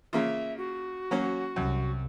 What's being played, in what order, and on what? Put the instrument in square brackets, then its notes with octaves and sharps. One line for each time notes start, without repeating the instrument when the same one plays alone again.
[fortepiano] C#3 A#3 F4 [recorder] E5
[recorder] F#4
[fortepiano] F#3 A#3 C#4
[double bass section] C2 [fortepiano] F#2